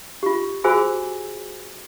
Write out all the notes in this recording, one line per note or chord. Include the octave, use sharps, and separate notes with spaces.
F4 G4
F4 F#4 G#4 C5 G#5 E6